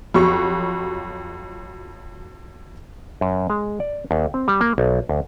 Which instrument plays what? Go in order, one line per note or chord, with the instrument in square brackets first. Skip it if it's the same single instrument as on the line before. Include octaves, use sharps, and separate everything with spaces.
[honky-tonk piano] F2 F#3 F#4 G4 C#6
[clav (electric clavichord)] F#2
G#3
D5
D#2
C4
G3
A#3
B1
D2